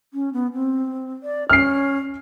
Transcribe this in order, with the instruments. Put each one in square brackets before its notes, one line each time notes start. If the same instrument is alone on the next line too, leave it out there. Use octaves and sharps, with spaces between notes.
[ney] C#4
B3
C4
D5
[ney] C#4 [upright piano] F6 C7